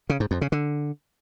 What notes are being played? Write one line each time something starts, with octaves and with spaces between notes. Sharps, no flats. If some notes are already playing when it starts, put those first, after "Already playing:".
C#3
G#2
F2
C#3
D3